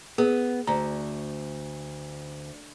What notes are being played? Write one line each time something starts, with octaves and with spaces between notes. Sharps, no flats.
B3 G#4
D2 A#5